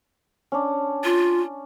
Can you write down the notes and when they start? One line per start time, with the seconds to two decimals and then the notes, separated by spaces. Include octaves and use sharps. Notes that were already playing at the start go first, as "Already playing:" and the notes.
0.52 C#4 D4
1.04 F4